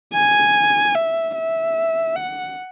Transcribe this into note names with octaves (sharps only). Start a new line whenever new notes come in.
G#5
E5
E5
F#5